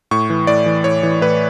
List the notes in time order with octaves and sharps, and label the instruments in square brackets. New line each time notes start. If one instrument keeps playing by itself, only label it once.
[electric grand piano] A2 C#6
E3
A2 D5
E3
A2 C#5
E3
A2 B4